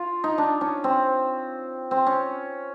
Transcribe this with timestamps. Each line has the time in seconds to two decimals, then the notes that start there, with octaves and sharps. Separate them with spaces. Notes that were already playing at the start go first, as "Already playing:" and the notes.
Already playing: F4
0.24 D#4
0.38 D4
0.61 C#4
0.84 C4
1.91 C4
2.06 C#4